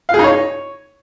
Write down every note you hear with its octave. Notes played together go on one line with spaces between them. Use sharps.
F5
G#4
D#4
C#5